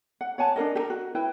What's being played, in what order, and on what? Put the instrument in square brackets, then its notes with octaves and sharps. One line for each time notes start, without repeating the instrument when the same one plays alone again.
[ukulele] F#5
C#5 F#5 G#5 A5
D4 G#4 A#4 D#5
G4 A#4
F#4
E4 B4 G5